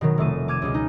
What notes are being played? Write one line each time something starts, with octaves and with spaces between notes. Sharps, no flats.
B2 D#3 F#3
F1 A3 A4 D#7
D6 F6 G#6 D#7 E7
C#2 B2 G#3
D#4